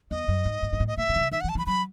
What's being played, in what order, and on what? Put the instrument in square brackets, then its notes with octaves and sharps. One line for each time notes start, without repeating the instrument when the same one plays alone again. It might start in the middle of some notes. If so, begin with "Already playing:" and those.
[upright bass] E2 [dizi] D#5
[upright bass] F#2
G#2
G#2
G#2
A2
[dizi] D#5
[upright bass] A2 [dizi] E5
[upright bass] B2
D#3
C#3
[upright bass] D#3 [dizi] E5
[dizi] F#5
[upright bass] E3
[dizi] A5
[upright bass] E3 [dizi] B5
[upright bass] F#3 [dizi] B5